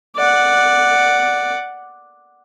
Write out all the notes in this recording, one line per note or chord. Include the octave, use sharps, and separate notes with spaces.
D5 F#5